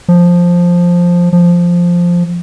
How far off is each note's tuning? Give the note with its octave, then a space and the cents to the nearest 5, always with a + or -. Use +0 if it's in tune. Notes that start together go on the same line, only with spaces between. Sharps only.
F3 +5
F3 +0